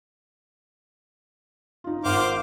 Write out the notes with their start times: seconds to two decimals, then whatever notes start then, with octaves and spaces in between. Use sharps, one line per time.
1.84 D#4 F4
2.05 G#1 A#4 C5 F5 F#5 D6